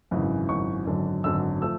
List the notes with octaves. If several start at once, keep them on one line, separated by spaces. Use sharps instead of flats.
G#1 F#2 C#3 E3
G#1 F#2 C#3 E3 C#6
G#1 F#2 D3 F#3
G#1 F#2 D3 F#3 E6
F3 A3 E6